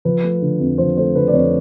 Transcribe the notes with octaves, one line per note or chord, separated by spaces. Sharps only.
F3 B4
A3
D3
F2
F3 C5
A3 C5
D3 B4
D5
F2 C#5